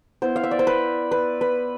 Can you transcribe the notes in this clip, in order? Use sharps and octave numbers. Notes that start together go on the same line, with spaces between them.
B3 E4 C5
F5
E5
D5
C5
B4
B4
B4